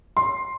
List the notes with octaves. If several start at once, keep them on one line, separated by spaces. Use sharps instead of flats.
C6